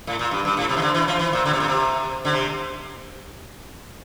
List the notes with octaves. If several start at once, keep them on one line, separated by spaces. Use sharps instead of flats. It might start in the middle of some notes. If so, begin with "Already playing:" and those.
A2
A#2
G2
G2
A2
C3
E3
D3
E3
F3
E3
A#2
D3
C3
A#2
C3
D3
C3